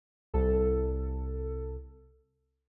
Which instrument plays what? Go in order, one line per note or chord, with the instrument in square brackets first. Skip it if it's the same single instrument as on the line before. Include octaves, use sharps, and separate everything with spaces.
[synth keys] C2 A4